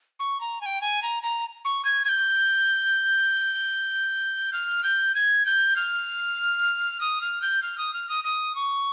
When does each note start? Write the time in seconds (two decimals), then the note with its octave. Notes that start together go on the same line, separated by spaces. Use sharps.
0.20 C#6
0.41 A#5
0.61 G#5
0.66 G5
0.81 G#5
1.03 A#5
1.23 A#5
1.65 C#6
1.85 G#6
2.05 G#6
2.09 G6
4.53 F6
4.84 G6
5.15 G#6
5.46 G6
5.76 F6
7.01 D#6
7.21 F6
7.42 G6
7.63 F6
7.78 D#6
7.94 F6
8.09 D#6
8.24 D#6
8.55 C#6